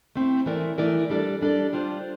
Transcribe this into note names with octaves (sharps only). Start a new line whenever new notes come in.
A3 C4 E4
E3 A3 E4 A#4 D5
E3 A3 E4 A#4 D5
G3 D4 A4 D5
G3 D4 A4 D5
G3 D4 F4 C5